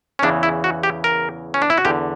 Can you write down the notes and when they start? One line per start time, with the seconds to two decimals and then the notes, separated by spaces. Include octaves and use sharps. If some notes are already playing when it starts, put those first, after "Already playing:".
0.19 C#4
0.23 E2 C#3 E3 D4
0.43 E4
0.64 F#4
0.83 G4
1.04 A#4
1.54 C#4
1.62 D4
1.70 E4
1.78 F#4
1.85 E2 D3 G4